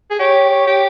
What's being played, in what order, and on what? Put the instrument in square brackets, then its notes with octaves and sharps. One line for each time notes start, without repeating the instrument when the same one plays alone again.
[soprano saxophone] G#4
[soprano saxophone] G4 [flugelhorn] C#5
[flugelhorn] C#5
[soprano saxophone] G4